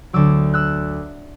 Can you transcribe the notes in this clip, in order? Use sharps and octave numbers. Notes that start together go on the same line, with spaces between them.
D2 D3 F#3 D6 E6
E6 F#6